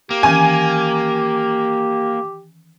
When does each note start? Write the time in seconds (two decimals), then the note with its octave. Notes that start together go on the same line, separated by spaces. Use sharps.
0.10 A#3 G4
0.23 D#3 E3 C#4 G#5